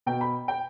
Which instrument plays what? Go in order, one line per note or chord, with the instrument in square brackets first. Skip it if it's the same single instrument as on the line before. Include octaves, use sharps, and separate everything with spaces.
[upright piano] B2 G5
B5
G5